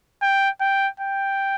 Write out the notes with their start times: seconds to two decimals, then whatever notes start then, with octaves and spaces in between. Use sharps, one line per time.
0.22 G5
0.61 G5
1.00 G5